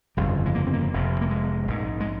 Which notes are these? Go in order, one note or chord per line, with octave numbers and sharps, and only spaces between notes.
G1 F2 C#3 G3
F3
G#3
A#3
C4
A#3
F1 F2 C3
A#3
G#3
A#1 G#2
G#3